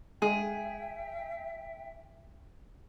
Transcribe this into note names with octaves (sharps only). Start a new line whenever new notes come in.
G#3 G#4 E5 G5